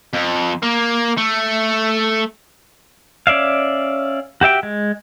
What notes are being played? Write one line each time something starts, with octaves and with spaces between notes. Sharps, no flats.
F2
A#3
A3
C#4 D5 E5 F5
F#4 G4 E5 G5
G#3